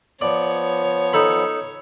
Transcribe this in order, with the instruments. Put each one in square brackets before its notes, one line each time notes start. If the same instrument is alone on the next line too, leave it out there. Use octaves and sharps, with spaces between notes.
[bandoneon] F3 B3 [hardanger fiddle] C#5 [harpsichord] D5
[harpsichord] D#4 A4 B5